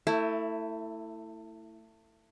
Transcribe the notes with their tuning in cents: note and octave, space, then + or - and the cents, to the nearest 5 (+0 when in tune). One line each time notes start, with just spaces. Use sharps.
A3 +25 E4 +0